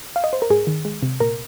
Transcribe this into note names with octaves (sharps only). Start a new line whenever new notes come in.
F5
D#5
C5
A#4
G#2 G#4
D#3
G#3
C3
A#2 A#4